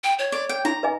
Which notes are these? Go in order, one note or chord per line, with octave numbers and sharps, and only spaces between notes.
G5
C#5
D5
G5
D#4 A#5
B4 D#5 G#5